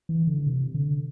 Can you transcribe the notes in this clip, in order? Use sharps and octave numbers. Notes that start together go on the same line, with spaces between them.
E3
D3
C3
D3